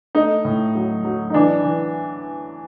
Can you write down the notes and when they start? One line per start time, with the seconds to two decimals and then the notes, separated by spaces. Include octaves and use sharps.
0.15 A3 D#4
0.45 A2
0.75 F#3
1.05 F#3
1.30 D#4
1.34 E3 D4
1.64 E3